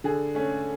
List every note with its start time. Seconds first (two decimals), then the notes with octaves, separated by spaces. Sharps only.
0.04 D3 G#4
0.35 A3 C#4